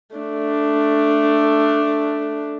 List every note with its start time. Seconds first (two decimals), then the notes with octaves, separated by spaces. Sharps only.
0.16 A3 D4